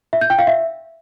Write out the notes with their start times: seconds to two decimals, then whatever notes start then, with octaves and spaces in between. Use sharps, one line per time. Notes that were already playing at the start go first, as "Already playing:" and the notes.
0.13 E5
0.21 G6
0.30 G5
0.39 F5
0.47 E5